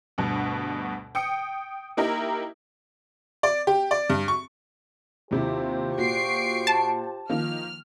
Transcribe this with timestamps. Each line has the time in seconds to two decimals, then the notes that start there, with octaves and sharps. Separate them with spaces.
0.18 D2 G2 B2
1.15 G5 D#6 C#7
1.97 A#3 D#4 E4 G4 A#4
3.43 D5
3.67 G4
3.91 D5
4.10 G2
4.28 C#6
5.31 D#2 C3 E4 F4 G4 C5
5.98 A#2 F#4 C#6 C7 D7
6.67 A5
7.30 D#3 F3 A#3 F6